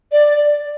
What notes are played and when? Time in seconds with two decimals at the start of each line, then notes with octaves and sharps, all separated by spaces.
0.12 D5